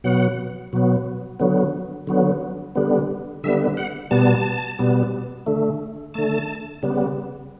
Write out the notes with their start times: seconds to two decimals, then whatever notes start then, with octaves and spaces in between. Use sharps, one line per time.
0.04 B2 F#3 B3 F#5
0.73 B2 F#3 B3
1.40 D3 F#3 B3
2.07 D3 F#3 B3
2.75 D3 G3 B3
3.44 D3 G3 B3 E5
3.77 F#5
4.11 B2 G3 B3 A5
4.79 B2 G3 B3
5.46 D3 A3
6.14 D3 A3 A5
6.83 C#3 G3 B3